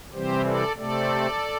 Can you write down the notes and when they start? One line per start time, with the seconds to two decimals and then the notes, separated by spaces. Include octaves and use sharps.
0.13 C3 E3 G3 C4 G4 C5
0.45 A4 D5
0.76 C3 A3 C4 A4 D5